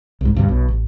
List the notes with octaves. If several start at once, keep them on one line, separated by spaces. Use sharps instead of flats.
C2 G#2
D2 G2 C3
B1 B2
A1